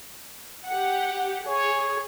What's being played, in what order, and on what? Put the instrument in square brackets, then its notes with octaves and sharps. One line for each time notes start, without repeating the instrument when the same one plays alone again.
[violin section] G4 F#5
[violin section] G#4 [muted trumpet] C#5